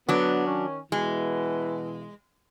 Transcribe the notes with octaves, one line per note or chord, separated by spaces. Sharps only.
D3 F#3 B3 D4
D#3 C#4
B2 E3 G#3